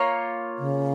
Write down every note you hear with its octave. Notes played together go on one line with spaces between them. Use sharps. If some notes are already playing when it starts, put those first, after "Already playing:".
Already playing: A#3 F4 C#5
C#3